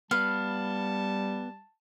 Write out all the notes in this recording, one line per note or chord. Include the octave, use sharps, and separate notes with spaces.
G3 B3 B4 F5 A5